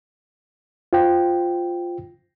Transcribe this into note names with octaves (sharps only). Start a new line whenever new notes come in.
F4 C5 G5